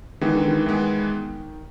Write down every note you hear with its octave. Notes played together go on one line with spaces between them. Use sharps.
D#3 E3 G#3 B3
D3
D#3
E3 G#3 B3